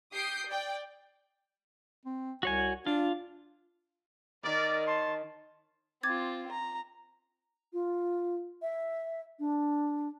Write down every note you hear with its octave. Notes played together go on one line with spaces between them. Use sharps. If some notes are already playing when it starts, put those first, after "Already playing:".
G4 D#6 G6 C7 D7
D5 G5
C4
C2 F#4 C#5 G#5
D4 F4
D#3 A#4 D5
C#5 A5 C6
C4 F4 D6 G#6 A6
A#5
F4
E5
D4